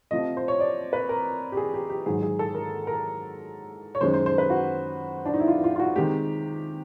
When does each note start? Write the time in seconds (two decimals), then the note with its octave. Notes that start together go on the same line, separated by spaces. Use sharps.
0.11 C3 F3 A3 D#5
0.37 C5
0.48 C#5
0.60 D5
0.93 B4
1.09 A#4
1.52 G4
1.57 G#4
1.74 G4
1.90 G4
2.06 G#2 D#3 F#3 G#4
2.23 G#4
2.39 A4
2.55 A#4
2.87 A#4
3.95 C#5
4.01 F#2 D#3 G#3 C5
4.14 C5
4.26 C5
4.38 B4
4.50 F#4
5.26 D4
5.34 D#4
5.40 E4
5.48 F4
5.64 F4
5.76 F4
5.80 F#4
5.96 C3 D#3 G#3 G4